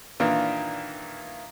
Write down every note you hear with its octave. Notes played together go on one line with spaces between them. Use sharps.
A#2 D#3 E3 D4 F4